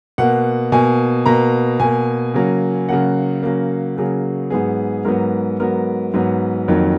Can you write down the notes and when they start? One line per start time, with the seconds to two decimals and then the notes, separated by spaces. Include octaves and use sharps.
0.18 B2 A#3 F#5
0.72 B2 A#3 G#5
1.26 B2 A#3 A#5
1.80 B2 A#3 G#5
2.34 C#3 F#3 A#3
2.89 C#3 F#3 A#3 F#5
3.43 C#3 F#3 A#3
3.97 C#3 F#3 A#3 G#4
4.50 G#2 F#3 B3 G#4
5.05 G#2 F#3 B3 A#4
5.60 G#2 F#3 B3 A#4
6.14 G#2 F#3 B3
6.68 F2 D#3 F#3 A#3